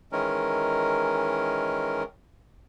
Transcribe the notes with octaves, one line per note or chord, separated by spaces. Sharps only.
D#3 E3 G#3 C#4 A#4